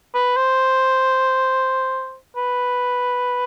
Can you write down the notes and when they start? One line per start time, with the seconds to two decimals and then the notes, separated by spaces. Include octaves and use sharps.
0.14 B4
0.37 C5
2.37 B4